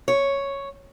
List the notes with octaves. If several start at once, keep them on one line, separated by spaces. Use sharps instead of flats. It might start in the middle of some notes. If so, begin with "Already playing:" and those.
C#5